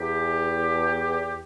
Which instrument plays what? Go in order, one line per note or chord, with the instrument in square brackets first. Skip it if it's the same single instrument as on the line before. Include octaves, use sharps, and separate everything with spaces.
[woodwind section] E2 G4